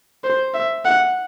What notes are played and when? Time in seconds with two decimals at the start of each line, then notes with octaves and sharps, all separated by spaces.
0.24 C5
0.54 E5
0.85 F#5